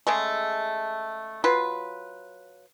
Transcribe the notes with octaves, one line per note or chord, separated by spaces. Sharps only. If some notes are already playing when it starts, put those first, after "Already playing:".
C#3 G#3 A3
F#3 F4 B4